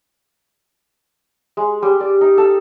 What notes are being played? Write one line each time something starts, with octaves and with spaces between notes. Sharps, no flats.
G#3
G3
D5
D#4
A4